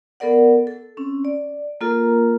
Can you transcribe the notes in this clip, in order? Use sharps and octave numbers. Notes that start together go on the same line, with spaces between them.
B3 A4 A#4 D5 F#5
A4
C4 C#4
D5
A#3 F4 A4 A#4 A#5